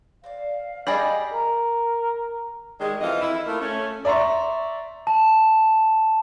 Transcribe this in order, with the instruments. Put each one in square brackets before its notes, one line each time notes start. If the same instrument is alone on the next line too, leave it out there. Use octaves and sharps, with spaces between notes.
[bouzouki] C4 D4 D5 [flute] F5
[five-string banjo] G3 G#4 D5 [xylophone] D#5 B5
[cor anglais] A#4
[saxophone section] D#3 G3 G#3
F2 E3 D#5 F5
E4
A3 A#3 E4 F4
A3 C#4
[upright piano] D5 E5 A#5 C6 C#6
[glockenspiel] A5